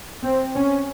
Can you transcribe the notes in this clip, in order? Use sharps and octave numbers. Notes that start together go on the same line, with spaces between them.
C4
C#4